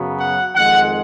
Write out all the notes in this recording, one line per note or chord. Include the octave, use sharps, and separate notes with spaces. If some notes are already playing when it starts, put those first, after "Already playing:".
Already playing: F#2 C#3 F#3 B3
F#5
F2 D#3 G#3 F#5